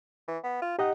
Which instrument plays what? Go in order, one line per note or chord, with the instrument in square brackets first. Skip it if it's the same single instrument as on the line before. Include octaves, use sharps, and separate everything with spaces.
[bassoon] E3
B3
F4
[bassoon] D#4 [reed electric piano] G4 D#5 F#5